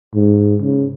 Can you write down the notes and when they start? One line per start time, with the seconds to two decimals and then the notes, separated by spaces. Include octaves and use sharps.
0.14 G#2
0.61 C#3